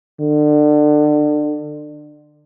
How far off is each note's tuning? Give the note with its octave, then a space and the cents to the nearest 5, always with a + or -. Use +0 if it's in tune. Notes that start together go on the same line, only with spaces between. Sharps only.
D3 +30